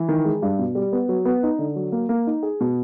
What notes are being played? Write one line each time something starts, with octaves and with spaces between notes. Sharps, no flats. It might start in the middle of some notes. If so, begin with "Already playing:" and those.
Already playing: E3
D#3
G#3
G2
B2
G3
B3
F#3
B3
D#4
D3
F#3
A#3
A#3
D#4
G#4
B2